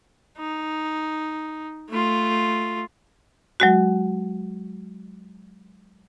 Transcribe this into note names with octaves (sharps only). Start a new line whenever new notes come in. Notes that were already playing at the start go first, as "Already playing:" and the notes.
D#4
A3 F4
F#3 G#3 F#4